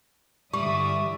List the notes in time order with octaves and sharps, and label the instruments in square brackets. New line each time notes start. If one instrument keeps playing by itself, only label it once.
[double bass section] G2 D3 E3 [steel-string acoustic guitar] G3 [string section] D5 E5 D#6 [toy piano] C#6